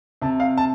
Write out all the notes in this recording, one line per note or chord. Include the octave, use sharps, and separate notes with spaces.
C3 A5
F5
A5